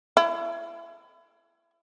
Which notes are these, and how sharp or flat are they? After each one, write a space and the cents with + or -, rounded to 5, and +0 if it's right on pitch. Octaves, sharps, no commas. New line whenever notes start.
E4 +30